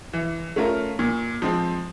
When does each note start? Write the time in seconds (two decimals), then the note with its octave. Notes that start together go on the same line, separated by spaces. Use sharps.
0.13 E3
0.56 A3 C#4 F4 A#4
0.99 A#2
1.42 F3 G#3 C4